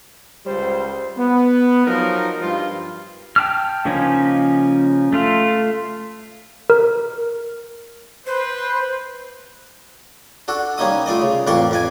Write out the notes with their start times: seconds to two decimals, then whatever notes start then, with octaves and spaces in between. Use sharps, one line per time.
0.46 C#2 G3 C5
1.16 B3
1.86 F3 F#3 D#4 A#4
2.40 G2 F3 G3 F4
3.36 G5 A5 F6
3.85 C#3 F3 A#3 C#4 D#4
5.13 A3 F4
6.70 A#4
8.26 B4 C5
10.48 D4 F#4 A4
10.78 G3 A#3 C#4 D#4 D#5 D#6
11.06 A3 F4 D5 D#5
11.22 C#3
11.47 A1 F2 A#3 D5 C6 C#6
11.71 F2 D5 G#5